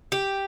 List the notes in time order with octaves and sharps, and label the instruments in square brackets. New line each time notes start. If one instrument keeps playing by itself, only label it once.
[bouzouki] G4